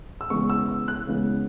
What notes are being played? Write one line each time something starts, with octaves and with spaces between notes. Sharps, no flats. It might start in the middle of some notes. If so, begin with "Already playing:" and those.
E6
C#3 E3 G#3 B3 C#6
E6
E6
F#6
C#3 E3 G#3 B3